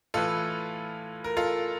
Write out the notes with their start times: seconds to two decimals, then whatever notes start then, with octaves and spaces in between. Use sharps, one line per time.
0.14 A2 E3 F4 A4
1.24 A#4
1.37 F4 A4